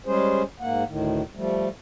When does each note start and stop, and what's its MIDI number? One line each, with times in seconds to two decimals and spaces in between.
0.06 0.43 55
0.06 0.43 56
0.06 0.43 61
0.06 0.43 68
0.06 0.43 72
0.60 0.83 44
0.60 0.83 58
0.60 0.83 78
0.88 1.22 38
0.88 1.22 45
0.88 1.22 51
1.35 1.68 53
1.35 1.68 55
1.35 1.68 57